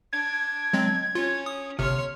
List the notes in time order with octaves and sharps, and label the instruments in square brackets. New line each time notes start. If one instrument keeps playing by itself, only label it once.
[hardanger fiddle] D4 [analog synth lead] G#6
[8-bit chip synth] F#3 G#3 C4
[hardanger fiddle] C#4 [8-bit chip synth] F4
[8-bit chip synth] D#6
[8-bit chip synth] G1 C3 [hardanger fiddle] C#5 C6 [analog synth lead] F6